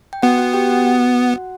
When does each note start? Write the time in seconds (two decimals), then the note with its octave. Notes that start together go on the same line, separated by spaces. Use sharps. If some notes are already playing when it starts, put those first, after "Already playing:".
0.13 G5
0.22 B3 F#4 F#5
0.38 F#4 F#5
0.53 G4 G5
0.69 F#4 F#5